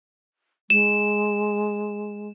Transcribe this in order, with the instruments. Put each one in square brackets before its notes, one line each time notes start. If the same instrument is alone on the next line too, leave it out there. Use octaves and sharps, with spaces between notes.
[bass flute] G#3 [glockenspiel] E7